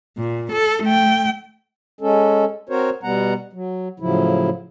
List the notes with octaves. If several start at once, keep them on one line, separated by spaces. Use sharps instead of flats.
A#2
A4
A3 G5
G#3 C#4 A4
C4 F#4 A#4 C5 C#5
B2 G3 B3 F#5 A#5
F#3
A2 C#3 F3 F#3 E4